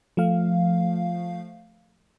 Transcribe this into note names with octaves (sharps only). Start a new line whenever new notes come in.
F3 A3 F5